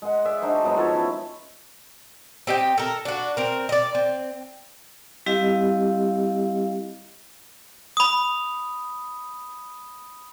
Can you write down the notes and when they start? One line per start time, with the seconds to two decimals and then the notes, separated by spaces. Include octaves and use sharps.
0.02 G#3 F#5
0.25 G#4 D5 E5
0.42 D4 D#4 F#4 C5
0.64 F#3 G#3 B3 D#4
0.77 F3 A4 C#5
0.93 C#4 E4
2.47 C4 G4 D#5 G5
2.78 A4 A#4
3.05 D4 F#4
3.37 C4 A#4
3.69 D5 D#5
3.95 C4
5.26 G3 C4 E4 G4 D#5 F5
7.97 B5 D#6